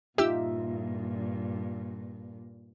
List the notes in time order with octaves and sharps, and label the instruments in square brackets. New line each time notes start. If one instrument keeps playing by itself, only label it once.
[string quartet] G2 A#2 [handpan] D#4 F4 E5 [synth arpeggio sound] G4 E6